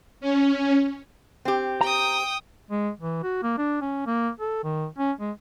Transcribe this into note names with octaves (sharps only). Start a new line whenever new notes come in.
C#4
C4 G4
G5 A#5 D#6
G#3
E3
F#4
A#3
D4
C#4
A#3
A4
D#3
C#4
G#3